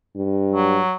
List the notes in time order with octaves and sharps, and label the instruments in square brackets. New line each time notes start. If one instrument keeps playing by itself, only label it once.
[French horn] G2
[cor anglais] F#3